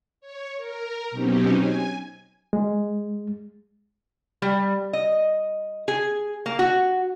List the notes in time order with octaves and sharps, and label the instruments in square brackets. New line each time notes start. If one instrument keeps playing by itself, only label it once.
[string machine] C#5
A#4
B2 F#3 C4 C#4 D#4 G4
G#5
[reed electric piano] G#3
[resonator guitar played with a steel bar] G3
D#5
G#4
A#3
F#4